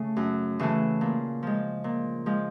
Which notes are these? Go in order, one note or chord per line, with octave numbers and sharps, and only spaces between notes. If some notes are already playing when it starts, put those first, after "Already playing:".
Already playing: C#3 A3
F#2
C#3 E3 A3
A#2
F3 G#3
A#2
F3 G#3